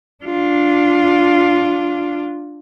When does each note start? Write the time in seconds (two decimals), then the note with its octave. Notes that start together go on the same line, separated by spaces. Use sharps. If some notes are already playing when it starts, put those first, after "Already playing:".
0.24 D4 F4